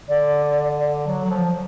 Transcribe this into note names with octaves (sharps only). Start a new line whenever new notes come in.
D3 D5
F#3
F#3
F3